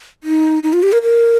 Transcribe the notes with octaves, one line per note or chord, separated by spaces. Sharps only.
D#4
D#4
F4
G4
A#4
A#4